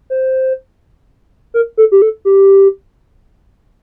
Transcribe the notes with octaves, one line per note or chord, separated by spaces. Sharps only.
C5
A#4
A4
G4
A4
G4